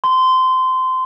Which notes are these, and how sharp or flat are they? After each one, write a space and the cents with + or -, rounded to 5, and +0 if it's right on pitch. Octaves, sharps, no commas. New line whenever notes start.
C6 -20